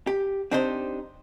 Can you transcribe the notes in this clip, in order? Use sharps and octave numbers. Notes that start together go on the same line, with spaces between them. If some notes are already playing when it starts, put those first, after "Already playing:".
G4
C4 D4 D#4 G4 C5